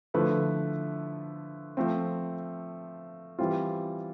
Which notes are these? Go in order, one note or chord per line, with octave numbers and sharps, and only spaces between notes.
D3 F3 A3 E4 B4
F3 A3 C4
E3 G3 C4 F4